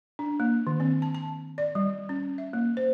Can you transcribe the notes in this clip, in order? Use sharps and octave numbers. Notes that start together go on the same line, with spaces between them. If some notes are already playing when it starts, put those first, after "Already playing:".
D4
A#3
D#3
C4
A5
A5
D5
G3
C#4
E5
A#3
C5